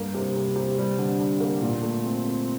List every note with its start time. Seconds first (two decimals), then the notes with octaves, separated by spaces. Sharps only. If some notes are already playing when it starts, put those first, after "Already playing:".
Already playing: G2 A#3
0.14 C3
0.36 C3
0.56 C3
0.78 G3
0.98 D3
1.19 D3
1.40 A#3
1.62 A#2
1.82 A3
2.04 C4
2.25 C4